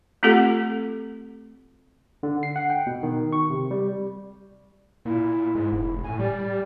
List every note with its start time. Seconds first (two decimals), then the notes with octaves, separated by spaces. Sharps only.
0.23 A3 C4 F4 G4 A4 F#5
2.23 D3
2.43 C7
2.56 F#5
2.70 G5
2.87 B2
3.03 D#3
3.33 C#6
3.50 C3
3.71 G3
5.05 A#2 E4
5.55 G#2
5.73 F1
6.04 A2 G#5
6.19 G3 D5